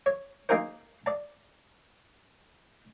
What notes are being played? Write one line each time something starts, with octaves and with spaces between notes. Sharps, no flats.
C#5
A#3 D#4 F4 G#4 A#4 C5
D5 A5